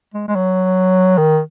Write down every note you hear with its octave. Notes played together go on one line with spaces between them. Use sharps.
G#3
G#3
F#3
D#3